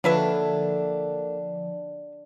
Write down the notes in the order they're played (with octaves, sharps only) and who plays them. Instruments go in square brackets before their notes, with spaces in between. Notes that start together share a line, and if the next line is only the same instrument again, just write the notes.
[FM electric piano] D3 F3 [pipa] F#3 B4 E5 [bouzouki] A#3 A4 [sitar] D4